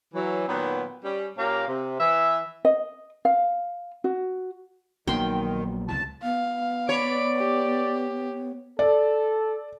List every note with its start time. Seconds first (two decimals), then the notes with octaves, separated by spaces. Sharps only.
0.14 E3 F#3
0.48 A#2 D#3 F#3 B3
1.04 G3 C#4
1.38 A#2 A#3 C#4 G4 A#4 F5
1.68 C3
2.00 E3 E5
2.65 D#5
3.25 F5
4.04 F#4
5.07 A#1 D#3 F#3 A#3 B3 G5 C6
5.88 C#2 C3 E3 A5
6.23 B3 F5
6.89 C#5 D5 B5 D7
7.38 G4
8.79 A4 D5